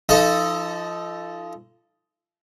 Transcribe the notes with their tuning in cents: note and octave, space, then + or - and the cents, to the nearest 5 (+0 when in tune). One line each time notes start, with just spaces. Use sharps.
F3 -20 D#4 +10 A4 +5